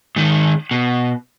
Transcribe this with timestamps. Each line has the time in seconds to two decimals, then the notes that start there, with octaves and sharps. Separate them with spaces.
0.16 G#2 D#3
0.71 B2